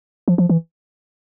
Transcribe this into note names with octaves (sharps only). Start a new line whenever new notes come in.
F3
F3
E3